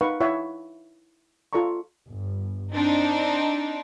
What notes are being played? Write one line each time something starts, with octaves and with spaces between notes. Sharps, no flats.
D#4 B4 F5 F#5 C#6
E4 C#5 E5 F#5
F4 A4 D5 A#5 C#6
G1
C4 D4 D#4